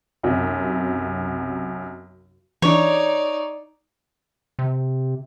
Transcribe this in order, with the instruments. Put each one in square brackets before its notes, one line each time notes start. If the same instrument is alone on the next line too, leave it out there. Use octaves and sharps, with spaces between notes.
[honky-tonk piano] B1 F#2 C3
[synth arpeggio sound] E3 D4 [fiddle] D#4 D5 [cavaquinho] C#5
[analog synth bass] C3